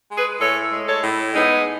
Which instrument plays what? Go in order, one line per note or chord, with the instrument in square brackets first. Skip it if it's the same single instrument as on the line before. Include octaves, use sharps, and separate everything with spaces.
[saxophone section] G#3
G#4 B4
A2 A4 C#5
G#3
A4 C#5
A2
G#3 B3 D#4